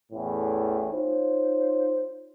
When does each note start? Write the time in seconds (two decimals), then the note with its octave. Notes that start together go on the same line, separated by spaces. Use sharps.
0.12 A1 E2 A2
0.93 D#4 F4 C5 C#5